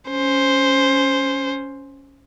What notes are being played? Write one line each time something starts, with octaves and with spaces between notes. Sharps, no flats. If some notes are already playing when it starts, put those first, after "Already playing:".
C#4 C5